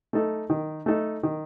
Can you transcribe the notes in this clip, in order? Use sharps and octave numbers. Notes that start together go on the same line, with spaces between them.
A3 D#4 A4
D#3
A3 D#4 A4
D#3